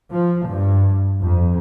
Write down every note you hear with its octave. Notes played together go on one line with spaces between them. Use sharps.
F3
G2
F2